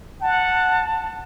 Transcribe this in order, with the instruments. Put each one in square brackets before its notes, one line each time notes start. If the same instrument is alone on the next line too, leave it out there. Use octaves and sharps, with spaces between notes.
[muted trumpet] F#5 [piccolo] A5